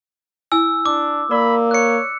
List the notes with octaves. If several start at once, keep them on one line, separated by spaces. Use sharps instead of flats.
E4 G#5 E6
D4 D6
A#3 A#4 D5 B5
C#5 F#6 C#7